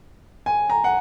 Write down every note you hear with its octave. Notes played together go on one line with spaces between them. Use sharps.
G#5
A#5
F#5